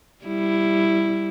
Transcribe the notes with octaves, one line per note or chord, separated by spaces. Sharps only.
G3 E4